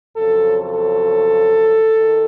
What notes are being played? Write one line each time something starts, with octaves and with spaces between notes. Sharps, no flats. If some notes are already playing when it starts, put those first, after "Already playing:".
F2 C#3 F#3 A4
A4
D#3